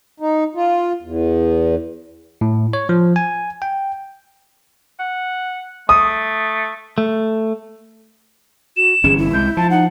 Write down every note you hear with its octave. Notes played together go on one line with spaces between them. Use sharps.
D#4
F4
E2
A2
C#5
F3
G#5
G5
F#5
A3 D#6
A3
F#4 E7
G1 E3 C#4 G#4
E4
C2 G#3 G6
F3 A5
D#4 F#5